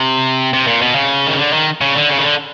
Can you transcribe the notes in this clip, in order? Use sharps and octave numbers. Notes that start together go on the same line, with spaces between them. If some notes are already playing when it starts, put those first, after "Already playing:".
Already playing: C3
C3
A#2
B2
C#3
D#3
D3
D#3
C#3
D3
C#3
D#3
D3